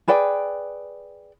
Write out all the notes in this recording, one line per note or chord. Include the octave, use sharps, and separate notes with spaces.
G#4 B4 D5 G5